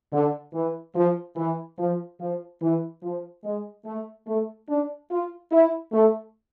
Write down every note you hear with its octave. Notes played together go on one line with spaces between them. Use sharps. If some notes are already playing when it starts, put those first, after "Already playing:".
D3
E3
F3
E3
F3
F3
E3
F3
G#3
A3
A3
D4
F4
E4
A3